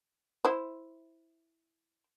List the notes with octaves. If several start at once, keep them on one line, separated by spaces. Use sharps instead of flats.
E4 C5